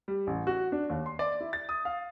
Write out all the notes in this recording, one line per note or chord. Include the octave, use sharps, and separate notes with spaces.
G3
A1
F#4
D4
D#2
C6
D5
E4
A6
D#6
F5